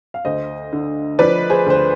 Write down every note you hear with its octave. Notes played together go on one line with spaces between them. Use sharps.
F5
D2 C5 D#5
D3
F3 B4 D5
G#4 C5
D2 C5